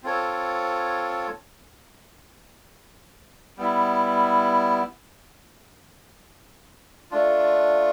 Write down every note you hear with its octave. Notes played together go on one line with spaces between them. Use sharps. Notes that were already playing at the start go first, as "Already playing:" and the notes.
C4 F4 A4 C#5
G3 B3 E4
A3 D4 F4